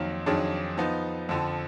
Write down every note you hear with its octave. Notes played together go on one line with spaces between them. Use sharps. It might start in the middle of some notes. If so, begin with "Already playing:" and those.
Already playing: F2 D#3 F#3 A#3
F2 D#3 F#3 D4 G#4
F3 B3 D#4
F2 D3 F3